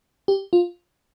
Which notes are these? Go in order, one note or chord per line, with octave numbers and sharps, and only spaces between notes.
G4
F4